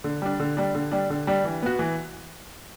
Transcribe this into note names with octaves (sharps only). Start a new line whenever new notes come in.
D3
G3 D4
D3
G3 D4
D3
G3 D4
D3
G3 D4
E3
B3 F#4
E3